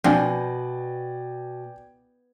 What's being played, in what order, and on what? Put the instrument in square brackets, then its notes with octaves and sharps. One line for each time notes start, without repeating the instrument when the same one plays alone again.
[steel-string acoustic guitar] B2 [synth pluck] F3 C4 D4 [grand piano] D5 G5 G#5